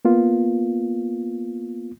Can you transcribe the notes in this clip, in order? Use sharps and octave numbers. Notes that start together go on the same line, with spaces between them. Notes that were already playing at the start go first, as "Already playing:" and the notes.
A#3 B3 F4